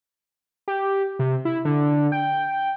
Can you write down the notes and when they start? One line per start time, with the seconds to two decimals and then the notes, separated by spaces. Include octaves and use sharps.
0.68 G4
1.19 C3
1.45 E4
1.65 D3
2.12 G5